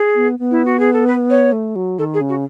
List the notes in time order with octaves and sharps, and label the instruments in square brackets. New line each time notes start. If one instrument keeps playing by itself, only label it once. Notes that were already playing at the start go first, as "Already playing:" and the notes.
Already playing: [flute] G#4
[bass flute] B3
B3
[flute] E4
F#4
G#4
A4
B4
C#5
[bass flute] A3
F#3
[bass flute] D#3 [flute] A4
[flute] G#4
[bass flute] C#3
[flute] F#4